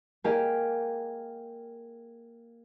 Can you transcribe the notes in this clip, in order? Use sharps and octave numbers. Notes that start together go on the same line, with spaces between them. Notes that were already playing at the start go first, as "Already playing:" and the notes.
A#3 G4 G#4 D#5